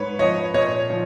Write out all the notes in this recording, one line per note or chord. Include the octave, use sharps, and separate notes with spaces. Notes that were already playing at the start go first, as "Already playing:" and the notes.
Already playing: G#2 B4 C#5
F3 C#5 D#5
A#2 C#5 D#5
F3